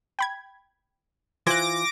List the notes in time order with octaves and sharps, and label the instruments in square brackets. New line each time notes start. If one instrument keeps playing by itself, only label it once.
[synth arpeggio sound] G5 B5 G#6
[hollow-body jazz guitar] E3 F4 C5 [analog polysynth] D6 A#6 D7 [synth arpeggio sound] F#6 G#6